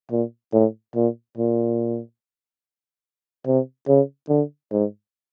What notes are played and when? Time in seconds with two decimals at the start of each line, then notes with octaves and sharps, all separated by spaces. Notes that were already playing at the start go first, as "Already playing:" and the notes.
0.11 A#2
0.53 A2
0.95 A#2
1.37 A#2
3.46 C3
3.88 C#3
4.29 D3
4.72 G#2